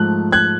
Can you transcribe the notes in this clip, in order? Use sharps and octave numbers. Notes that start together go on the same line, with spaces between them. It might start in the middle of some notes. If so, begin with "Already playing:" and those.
Already playing: G#2 F3 A3 F#6
F#6 G#6